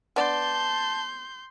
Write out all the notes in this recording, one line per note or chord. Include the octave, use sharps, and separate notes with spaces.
B3 D4 D5 A5 C6 G6